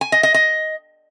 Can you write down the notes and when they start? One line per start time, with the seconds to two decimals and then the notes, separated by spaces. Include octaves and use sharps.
0.01 G#5
0.12 D#5
0.23 D#5
0.34 D#5